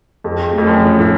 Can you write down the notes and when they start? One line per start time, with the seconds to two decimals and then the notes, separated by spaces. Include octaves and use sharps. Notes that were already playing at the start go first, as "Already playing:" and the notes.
0.24 F2 G#4
0.53 F2 A3
0.67 F#2
0.81 F3
0.99 A2